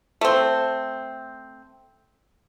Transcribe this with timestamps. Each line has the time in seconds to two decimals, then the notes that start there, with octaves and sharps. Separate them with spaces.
0.21 A3 C4